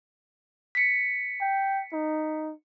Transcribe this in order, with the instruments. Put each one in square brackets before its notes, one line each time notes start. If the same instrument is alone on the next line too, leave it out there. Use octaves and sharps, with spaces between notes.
[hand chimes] B6 C#7
[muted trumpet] G5
D#4